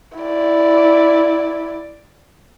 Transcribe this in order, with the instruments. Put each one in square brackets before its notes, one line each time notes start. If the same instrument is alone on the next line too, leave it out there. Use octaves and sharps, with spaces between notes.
[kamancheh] E4 D5